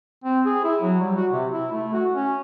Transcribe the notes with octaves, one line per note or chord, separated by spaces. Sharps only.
C4
G#4
E4
F#3
G3
F#4
C3
E4
A3
F#4
C#4